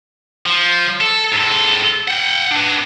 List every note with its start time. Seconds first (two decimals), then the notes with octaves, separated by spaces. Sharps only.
0.46 F3
1.01 A4
1.32 G#2 A4
2.08 F#5 G5
2.51 D4 B4